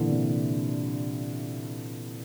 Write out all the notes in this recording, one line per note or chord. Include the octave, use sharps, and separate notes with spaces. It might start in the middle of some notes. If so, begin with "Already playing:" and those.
Already playing: A#2 D3 E3
C3